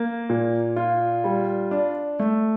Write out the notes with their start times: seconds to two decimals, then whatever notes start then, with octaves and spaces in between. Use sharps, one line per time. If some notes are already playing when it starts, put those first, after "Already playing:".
Already playing: A#3
0.29 A#2
0.76 F4
1.24 G3
1.71 D4
2.19 A3